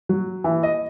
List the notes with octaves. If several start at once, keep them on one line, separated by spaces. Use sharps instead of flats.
F#3
E3
D#5